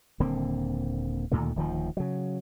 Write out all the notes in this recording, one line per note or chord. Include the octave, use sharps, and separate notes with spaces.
D#1 D3 A#3 C4
D2 A#2 D#3 A3
D1 D#3 F3
C#3 F#3